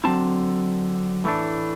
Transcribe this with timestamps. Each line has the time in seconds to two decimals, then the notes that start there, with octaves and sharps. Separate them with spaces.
0.04 D3 F#3 C4 E4 A5
1.24 A2 E3 A3 D4